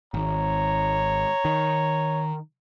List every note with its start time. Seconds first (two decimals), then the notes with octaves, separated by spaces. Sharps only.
0.14 G#1 C#5 A#5
1.45 D#3